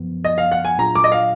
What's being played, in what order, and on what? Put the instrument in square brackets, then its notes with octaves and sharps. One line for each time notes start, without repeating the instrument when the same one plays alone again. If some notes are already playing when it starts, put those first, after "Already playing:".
Already playing: [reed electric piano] F#2 F3 B3
[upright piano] D#5
F5
F#5
G#5
[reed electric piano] A#2 F#3 D4 F4 G#4 [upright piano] A#5
[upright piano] D6
D#5
F5